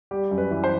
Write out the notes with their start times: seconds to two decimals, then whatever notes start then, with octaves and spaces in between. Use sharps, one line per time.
0.11 G3 G4
0.31 F#2
0.38 B4
0.51 E3
0.64 C5